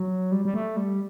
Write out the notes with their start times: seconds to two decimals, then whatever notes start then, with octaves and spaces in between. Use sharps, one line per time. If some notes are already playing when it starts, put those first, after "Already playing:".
Already playing: F#3
0.32 G3
0.45 G3
0.54 A3
0.77 G3